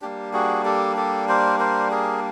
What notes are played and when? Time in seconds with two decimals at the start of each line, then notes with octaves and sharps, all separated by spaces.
0.02 G3 A#3 D4 G4
0.33 F#4 G#4
0.65 G4 A4
0.97 G4 A4
1.29 A#4 C5
1.60 A#4 C5
1.91 G#4 A#4